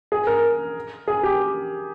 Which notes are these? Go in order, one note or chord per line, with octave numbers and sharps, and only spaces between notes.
G#4
A#4
G#4
G4